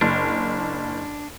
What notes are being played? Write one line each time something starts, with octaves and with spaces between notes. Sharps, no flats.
F#1 D4